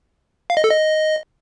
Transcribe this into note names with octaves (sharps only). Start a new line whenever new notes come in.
F5
D#5
A4
D#5